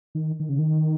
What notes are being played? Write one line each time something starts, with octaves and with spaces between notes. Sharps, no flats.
D#3
D#3
C#3
D#3